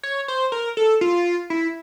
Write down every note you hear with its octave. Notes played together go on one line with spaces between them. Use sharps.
C#5
C5
A#4
A4
F4
E4